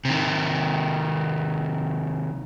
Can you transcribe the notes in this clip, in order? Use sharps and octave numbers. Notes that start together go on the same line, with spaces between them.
C3 D#3